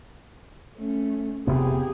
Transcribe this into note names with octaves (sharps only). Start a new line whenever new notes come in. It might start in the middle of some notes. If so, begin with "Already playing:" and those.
A3 C#4
F1 C3 B3 G4 G#4